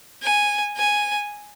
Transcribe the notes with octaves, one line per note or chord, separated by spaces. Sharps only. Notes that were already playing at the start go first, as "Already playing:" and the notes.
G#5
G#5